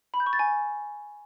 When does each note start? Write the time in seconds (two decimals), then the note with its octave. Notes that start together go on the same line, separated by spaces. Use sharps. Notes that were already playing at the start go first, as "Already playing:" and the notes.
0.14 B5
0.20 G6
0.26 C#6
0.33 A6
0.39 G#5